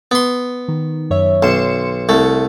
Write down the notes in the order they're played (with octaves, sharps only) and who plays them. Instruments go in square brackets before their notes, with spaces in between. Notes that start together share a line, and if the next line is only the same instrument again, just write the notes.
[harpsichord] B3 C6
[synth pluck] D#3
F#2 C#5 E5
[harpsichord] B1 [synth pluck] C6 C#7 E7
[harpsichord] C2 A3